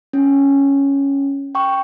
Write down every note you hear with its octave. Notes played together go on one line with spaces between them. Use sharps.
C#4
G5 C#6